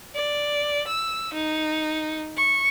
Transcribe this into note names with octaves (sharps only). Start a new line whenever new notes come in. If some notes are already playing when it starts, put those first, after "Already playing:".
D5
E6
D#4
C#6